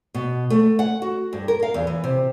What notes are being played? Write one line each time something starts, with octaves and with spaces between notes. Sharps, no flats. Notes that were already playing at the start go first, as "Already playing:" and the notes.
B2
A3
F#5
F#4
G2
A#4
F5
E2
E3
C3